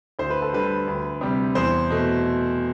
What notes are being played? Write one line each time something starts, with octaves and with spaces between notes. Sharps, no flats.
D2 C5
B4
A4
D3 G3 B4
D2
C3 G3
E2 C5
B2 A3